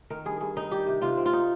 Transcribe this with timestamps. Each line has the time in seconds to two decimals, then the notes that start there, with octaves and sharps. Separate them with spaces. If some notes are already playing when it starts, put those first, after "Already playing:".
0.10 D#3 A#4
0.25 G2 G#4
0.41 G2 G#4
0.56 D#3 D#4
0.71 G3 G4
0.86 C3
1.02 C3 F4
1.17 C4
1.26 F4
1.33 D#4